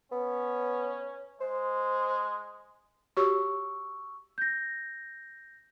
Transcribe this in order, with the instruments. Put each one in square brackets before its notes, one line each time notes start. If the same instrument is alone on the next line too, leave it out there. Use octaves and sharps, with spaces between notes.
[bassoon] B3 [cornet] C#4
[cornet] G#3 [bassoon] C5
[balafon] F#4 G4 C#5 [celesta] C#6 E6
[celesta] G6 A#6